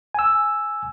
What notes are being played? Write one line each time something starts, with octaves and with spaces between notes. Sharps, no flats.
G#5 E6